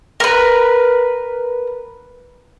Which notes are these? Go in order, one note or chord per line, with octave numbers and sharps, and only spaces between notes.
A#4 B4